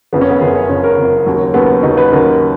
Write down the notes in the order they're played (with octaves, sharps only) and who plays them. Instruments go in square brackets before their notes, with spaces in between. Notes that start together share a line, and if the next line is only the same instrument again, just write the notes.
[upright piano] F#1 F2 C#3 B3
C#4
B3
F#1 F2 C#3 G#4
C#5
F#1 F2 C#3 C#5
A#4
F#1 F2 C#3
D#2 C#3 F#3
D#2 C#3 F#3 B3
D#2 C#3 F#3 D#4
B4
D#2 C#3 F#3 A#4